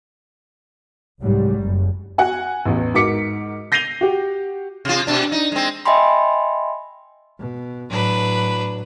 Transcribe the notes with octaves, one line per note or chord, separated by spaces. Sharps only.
C2 G#2 F#3 G3
F#1 F#2
F#4 F#5 G#5
A1 E2
G#2 F#4 A#4 D6 B6 C#7
G6 A#6 C7 D#7 F7 G7
F#4 G4
C3 F4
B2 D4
D#4
G#3 C4
D#5 E5 G5 G#5 B5 C6
B2
A2 F#3 D4 B4